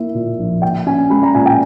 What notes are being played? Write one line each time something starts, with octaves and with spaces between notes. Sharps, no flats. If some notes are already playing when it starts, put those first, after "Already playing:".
Already playing: A#3 E4 E5
A#2
A#1
A#2 G5
C#4 G#5
G#3 B5
A#5
A#2 G#5
G5